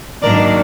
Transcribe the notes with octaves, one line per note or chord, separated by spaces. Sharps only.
G#2 D#3 F#3 A#3 D4 A#4 D5